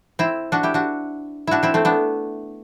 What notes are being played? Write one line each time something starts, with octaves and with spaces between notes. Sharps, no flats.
C4 E4
D4 F#4
E4 G4
D4 F#4
D4 E4 F#4
C4 E4
A3 C4
B3 D4